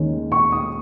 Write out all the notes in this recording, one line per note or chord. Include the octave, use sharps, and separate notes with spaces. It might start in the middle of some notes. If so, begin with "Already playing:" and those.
Already playing: D#2 D#3 G#3 C#4
C#6
D#6